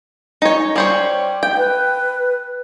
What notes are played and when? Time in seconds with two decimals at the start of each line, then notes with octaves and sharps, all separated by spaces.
0.42 D#4 C#5
0.76 G3 C5 C#5
1.43 G5
1.57 B4